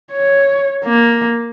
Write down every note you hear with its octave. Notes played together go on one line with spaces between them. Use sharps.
C#5
A#3